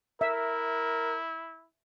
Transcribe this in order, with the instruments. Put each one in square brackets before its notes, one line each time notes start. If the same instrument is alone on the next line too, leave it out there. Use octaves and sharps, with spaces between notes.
[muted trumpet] E4 [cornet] A#4 [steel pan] E5